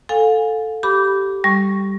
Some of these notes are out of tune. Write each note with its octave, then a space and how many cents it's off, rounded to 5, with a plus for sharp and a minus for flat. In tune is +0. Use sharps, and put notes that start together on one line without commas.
A4 +0 F5 +35 G#5 -20
G4 -10 B5 +0 D6 -20
G3 +0 C#6 +0